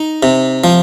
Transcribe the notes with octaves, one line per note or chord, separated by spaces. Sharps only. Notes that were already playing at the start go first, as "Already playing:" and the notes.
Already playing: D#4
C3
F3